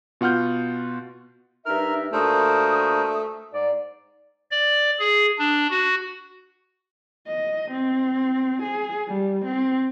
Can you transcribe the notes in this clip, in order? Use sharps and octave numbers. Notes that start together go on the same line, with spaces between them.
B2 F4 F#5 F6 G6
G2 D#4 A#4 E5 F6
A#2 A3 D4 F#4 A#4 C5 D#6
G#2 D5
D5
G#4
D4
F#4
D#5
C4
G#4
G3
C4